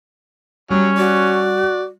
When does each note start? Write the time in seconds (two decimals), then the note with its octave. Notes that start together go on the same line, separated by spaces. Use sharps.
0.70 F#3 G3 C#4
0.98 F#4 D5